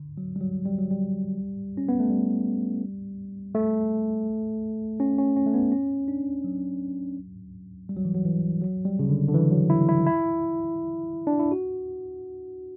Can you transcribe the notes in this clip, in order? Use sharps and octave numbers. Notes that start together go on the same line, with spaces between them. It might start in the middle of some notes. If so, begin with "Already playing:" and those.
Already playing: D3
F#3
G3
F#3
G3
F#3
G3
C#4
B3
A3
G3
A3
C#4
C#4
C#4
A3
B3
C#4
D4
F#3
G3
F#3
E3
F#3
E3
F#3
G3
C#3
D3
D3
E3
F#3
E4
E4
E4
D4
E4
F#4